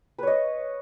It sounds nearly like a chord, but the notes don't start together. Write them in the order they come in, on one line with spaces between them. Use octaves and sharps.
B4 C#5 D#5